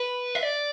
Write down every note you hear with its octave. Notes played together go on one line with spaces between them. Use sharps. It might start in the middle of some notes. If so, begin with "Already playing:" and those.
Already playing: B4
E5
D5